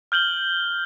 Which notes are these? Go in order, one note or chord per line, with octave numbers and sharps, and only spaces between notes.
F6 G6 F#7 G7